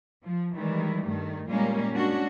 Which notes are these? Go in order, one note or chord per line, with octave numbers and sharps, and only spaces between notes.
F3
D#3 E3 G3 G#3
G2 D#3 A3
A#2 G3 G#3 A#3 C#4
G#3 C#4 D4 F#4